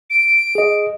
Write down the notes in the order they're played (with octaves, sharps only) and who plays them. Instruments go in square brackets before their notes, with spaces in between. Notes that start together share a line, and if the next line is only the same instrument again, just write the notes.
[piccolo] D7
[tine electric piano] G#4 D#5